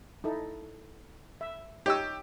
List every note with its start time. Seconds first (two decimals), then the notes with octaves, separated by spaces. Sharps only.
0.24 D#4 E4 A4
1.41 E5
1.86 D#4 G4 C#5 D#5 E6